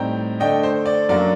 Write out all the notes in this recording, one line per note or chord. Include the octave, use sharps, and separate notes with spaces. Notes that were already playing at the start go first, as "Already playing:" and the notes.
Already playing: A2 G3 C4 D#4 G5 A#5
D3 A3 D4 D#5 G5
C5
D5
F#2 F#3 A#3 D4 D5